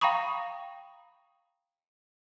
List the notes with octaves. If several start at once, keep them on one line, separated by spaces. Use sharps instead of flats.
F5 G5 A#5 B5 C#6 D#6